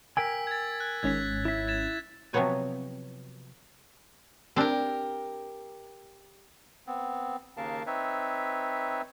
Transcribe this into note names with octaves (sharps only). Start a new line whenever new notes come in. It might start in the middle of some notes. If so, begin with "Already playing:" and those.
A#4 G5 G#5 E6 B6
G#6 A6
F#6
G#1 G#2 C#4 G#6 B6
E4 E5
G#6 A6 E7
C3 F3 F#3 B3 C#5 G#5
C4 D4 G4 A#4
B3 C4
D#2 C#3 A#4 F5 A5
C4 D#4 B4 C#5 E5